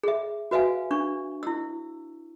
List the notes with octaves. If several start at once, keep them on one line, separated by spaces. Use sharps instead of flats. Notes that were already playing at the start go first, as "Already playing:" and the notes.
G#4 E5
F#4 B4 E5 F5 G#5
D4 C#6
E4 E6